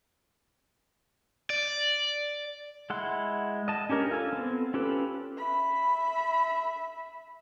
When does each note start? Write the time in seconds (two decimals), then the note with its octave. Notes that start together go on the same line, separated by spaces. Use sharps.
1.50 D5
2.90 G#3 E4 F#5 C6
3.68 D#5 A5
3.89 C#4 D4 G4 A#4 C#5
4.11 F4 A4 G#5
4.33 B3 C4 A4
4.74 C#4 F4 G4 A4 B4
5.38 E5 B5